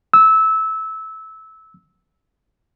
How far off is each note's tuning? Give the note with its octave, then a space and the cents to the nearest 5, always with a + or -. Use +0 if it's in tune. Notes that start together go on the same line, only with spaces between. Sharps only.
E6 -20